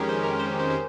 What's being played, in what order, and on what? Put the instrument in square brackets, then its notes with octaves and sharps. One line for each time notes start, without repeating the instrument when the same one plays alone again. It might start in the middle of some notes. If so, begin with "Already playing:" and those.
Already playing: [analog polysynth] F2 D#3 G#3 C#4 G4 [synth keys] G#4 A#4
[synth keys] C5
A#4
C5
C5
C5